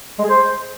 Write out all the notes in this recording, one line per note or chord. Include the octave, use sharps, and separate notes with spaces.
G#3
G#4
C5